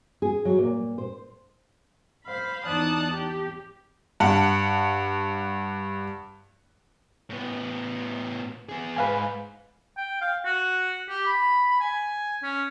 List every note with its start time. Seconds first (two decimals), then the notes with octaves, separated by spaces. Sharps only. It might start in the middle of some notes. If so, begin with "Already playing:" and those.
0.22 G#4
0.45 F#3
0.59 A#2
0.98 C5
2.25 C5 F5 B5
2.66 E2 D#4 D5 A5 D#6 F#6
3.10 G4
4.20 G2 F#5
7.30 A2 B3
8.69 B3 G#4
8.96 G#2 B4 F5 G#5
9.97 G5
10.21 F5
10.45 F#4
11.09 G4
11.26 B5
11.80 G#5
12.43 C#4